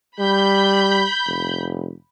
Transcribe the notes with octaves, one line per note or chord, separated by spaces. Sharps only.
G3 B5 G6
F1